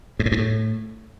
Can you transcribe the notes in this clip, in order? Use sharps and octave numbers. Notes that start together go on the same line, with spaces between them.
G#2
A2
G2
A2